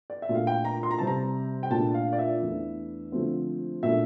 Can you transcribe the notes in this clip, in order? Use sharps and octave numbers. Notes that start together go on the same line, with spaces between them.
D5
E5
A#2 A3 D4
F5
G5
A#5
C6
A#5
C3 G3 C4 A5
A#5
G5
A#2 A3 D4 A5
F5
D5
E5
E2 E3 A3 D4
D3 F3 A3 C4
A#2 A3 D4 E5